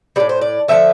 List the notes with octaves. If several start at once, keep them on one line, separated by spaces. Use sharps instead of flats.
A2 G3 D5
C5
D5
D3 F3 A3 E5